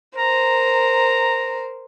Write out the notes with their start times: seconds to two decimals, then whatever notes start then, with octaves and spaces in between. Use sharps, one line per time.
0.18 A#4 C5 A#5